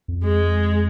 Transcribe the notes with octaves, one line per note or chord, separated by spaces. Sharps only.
F2
G#3